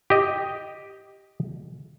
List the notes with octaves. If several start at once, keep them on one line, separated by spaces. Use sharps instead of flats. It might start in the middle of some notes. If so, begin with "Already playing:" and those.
G4 D#5